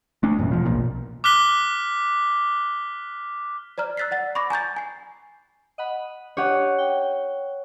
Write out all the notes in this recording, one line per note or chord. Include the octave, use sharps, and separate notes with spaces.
A3 D4
A1 F#2 B2
E1 F3
B1 A#2
D6 F6 F#6 B6 G7
C5 D5 A#5 F6
E6 F#6 A6 B6 C7
D5 F#5 A6
B5 C#6 D6 A#6
G#5 A#5 G6 A6
G#5 C7
D#5 F#5 B5
D4 G4 C#5 D#5 F#5
G5